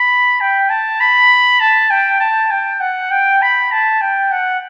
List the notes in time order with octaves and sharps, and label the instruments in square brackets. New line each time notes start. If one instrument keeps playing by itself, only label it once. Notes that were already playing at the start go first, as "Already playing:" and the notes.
Already playing: [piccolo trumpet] B5
G5
A5
B5
A5
G5
A5
G5
F#5
G5
B5
A5
G5
F#5